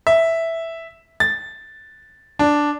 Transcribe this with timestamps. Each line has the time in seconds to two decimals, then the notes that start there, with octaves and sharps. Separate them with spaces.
0.07 E5
1.20 A6
2.39 D4